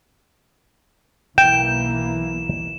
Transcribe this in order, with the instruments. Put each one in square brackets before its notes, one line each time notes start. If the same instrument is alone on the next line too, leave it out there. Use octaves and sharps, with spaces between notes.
[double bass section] B1 E3 A#3 [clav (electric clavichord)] G5 [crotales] E7